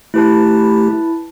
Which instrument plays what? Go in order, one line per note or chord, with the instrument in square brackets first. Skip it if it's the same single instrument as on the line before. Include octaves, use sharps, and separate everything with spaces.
[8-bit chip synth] A3 G4 [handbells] E4 B4 A5